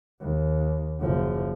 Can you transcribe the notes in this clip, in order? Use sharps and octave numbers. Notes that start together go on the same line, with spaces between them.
D#2
F#1 F3